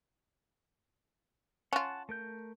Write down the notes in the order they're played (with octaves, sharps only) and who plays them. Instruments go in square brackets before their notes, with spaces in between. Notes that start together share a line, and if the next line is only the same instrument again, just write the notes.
[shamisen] C#4 F4 [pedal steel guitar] F#5 A5
[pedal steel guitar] A3 A#4 G6